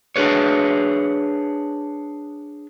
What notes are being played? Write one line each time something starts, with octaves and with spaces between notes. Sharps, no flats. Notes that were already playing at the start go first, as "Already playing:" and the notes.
D4 G#4 B4 C#5